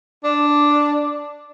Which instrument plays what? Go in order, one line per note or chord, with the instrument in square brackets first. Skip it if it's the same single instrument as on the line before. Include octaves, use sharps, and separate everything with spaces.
[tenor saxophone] D4